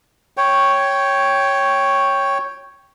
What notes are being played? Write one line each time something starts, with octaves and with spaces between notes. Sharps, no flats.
C#5 G5